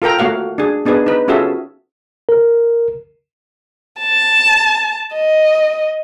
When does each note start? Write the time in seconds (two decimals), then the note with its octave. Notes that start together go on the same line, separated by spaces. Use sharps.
0.02 F4 A4 A#4 G5 A#5
0.19 A3 A#3 F#4 F5 F#5
0.58 D4 G#4
0.85 B3 D4 D#4 G#4 B4
1.06 D#4 B4
1.28 C#4 F4 F#4 G#4 A4 E5
2.29 A#4
4.00 A5
5.15 D#5